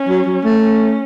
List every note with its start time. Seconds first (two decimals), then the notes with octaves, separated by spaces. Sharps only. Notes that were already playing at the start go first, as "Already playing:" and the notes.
Already playing: C#4
0.08 F#3
0.26 F#3
0.44 A3
0.62 C#4